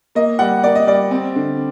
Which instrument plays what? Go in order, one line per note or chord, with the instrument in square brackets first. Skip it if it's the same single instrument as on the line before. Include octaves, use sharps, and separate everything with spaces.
[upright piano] A#3 D#5
G3 F#5
A#3 D5
D#5
G3 D5
C4
D3